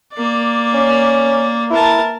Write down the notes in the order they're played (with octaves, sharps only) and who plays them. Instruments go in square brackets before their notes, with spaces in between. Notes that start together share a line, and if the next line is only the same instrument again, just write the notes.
[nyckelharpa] A#3 D5
[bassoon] C#4
[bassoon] E4 [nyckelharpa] A#4 A5